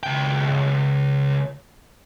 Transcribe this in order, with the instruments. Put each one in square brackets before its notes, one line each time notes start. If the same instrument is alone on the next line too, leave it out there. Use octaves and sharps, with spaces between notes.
[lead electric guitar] C#2 G5